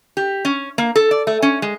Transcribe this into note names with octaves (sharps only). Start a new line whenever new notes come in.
G4
C#4
A#3
A4
D5
A3
C#4
G#3